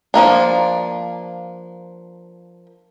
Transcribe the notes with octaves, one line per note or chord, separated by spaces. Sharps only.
F3 G#3 A#3 D4